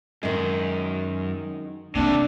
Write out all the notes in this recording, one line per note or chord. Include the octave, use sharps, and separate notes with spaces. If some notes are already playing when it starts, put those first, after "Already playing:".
F#2 D#3 G#3
C3 A3 A#3 C4 D4